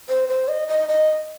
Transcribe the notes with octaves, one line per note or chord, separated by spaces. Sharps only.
C5
C5
D#5
D#5
D#5